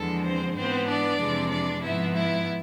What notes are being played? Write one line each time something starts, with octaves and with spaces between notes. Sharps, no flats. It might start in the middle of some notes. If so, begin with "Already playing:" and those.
Already playing: E2 D3 F3 G#3 A4
C4 C5
G#2 E3 B3 C4 C5
D4 D5
F2 C3 E3 G#3
D4 D5
G#2 F3 B3 E4 E5
E4 E5